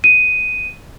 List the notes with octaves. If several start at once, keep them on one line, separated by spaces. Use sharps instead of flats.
D#7